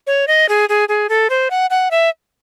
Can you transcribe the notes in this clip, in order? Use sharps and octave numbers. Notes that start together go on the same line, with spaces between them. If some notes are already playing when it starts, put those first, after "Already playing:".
C#5
D#5
G#4
G#4
G#4
A4
C5
F#5
F#5
E5